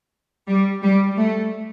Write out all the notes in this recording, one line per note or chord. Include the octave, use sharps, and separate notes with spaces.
G3
G3
A3